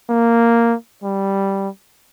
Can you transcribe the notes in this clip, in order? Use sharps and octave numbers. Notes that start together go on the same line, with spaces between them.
A#3
G3